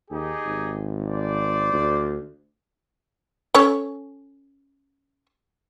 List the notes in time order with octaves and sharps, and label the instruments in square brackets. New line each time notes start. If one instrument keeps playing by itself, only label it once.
[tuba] D#2 [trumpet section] D#4 G4 G#4
[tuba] G#1
[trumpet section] C5 D5
[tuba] D2
[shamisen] C#4 A4 C#5